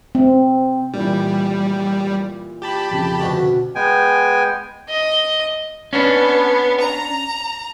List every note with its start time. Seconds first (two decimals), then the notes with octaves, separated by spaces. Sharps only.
0.15 C4
0.94 A#2 E3 G3
2.62 G4 A5 B5
2.91 F2 C#3
3.20 D2 B2
3.75 G#3 B3 G5 G#5
4.89 D#5
5.93 B3 C#4 D4
6.80 A#5